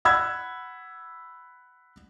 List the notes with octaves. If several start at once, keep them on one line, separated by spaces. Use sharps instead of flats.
F#5 B5 E6 G#6